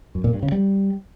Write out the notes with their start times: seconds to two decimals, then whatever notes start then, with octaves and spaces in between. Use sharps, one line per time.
0.15 F#2
0.24 A#2
0.33 G2
0.43 C#3
0.52 G3